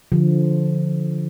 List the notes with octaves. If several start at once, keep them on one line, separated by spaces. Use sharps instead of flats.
D3 F3